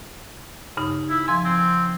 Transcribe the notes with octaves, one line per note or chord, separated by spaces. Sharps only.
G2 C#3 D#4
E4
F3 G#5 C6
C4